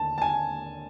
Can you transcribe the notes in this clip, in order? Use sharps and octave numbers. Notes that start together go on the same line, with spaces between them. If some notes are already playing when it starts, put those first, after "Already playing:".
Already playing: D#2 D3 A5
A5
G#5